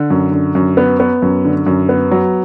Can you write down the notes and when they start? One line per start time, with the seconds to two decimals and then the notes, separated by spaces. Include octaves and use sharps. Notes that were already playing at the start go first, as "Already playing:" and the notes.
Already playing: D3
0.10 F#2
0.32 D3
0.55 F#2
0.77 B3
1.00 B3
1.22 F#2
1.45 D3
1.67 F#2
1.89 B3
2.11 F#3